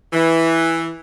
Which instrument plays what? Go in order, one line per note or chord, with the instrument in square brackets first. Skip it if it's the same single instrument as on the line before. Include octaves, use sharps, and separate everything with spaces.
[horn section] E3